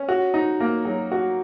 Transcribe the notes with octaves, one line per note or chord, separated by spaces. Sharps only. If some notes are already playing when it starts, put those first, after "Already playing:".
Already playing: C#4
F#4
D#4
A#3
F#3
F#4